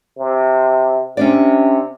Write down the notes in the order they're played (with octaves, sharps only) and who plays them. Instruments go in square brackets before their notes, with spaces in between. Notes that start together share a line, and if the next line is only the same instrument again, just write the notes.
[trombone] C3
[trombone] C3 [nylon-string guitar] C#4 D4 D5